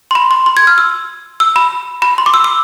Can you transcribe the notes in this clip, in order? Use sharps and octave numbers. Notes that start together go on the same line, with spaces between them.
C6
B5
C6
C6
G#6
F6
E6
E6
B5
B5
C6
D6
E6
E6